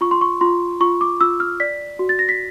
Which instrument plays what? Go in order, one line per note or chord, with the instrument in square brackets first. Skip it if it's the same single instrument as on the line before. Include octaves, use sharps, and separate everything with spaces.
[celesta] F4 C#6
C6
C#6
F4 C6
F4 C#6
D6
F4 E6
F6
D5 B6
F#4
A6
A#6
B6